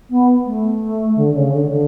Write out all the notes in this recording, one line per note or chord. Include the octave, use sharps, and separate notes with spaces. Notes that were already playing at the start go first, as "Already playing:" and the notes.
B3
A3
D3
C#3
D3
D3